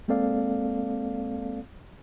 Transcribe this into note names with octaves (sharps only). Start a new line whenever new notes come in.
G#3 A#3 C4 A4 D5 F5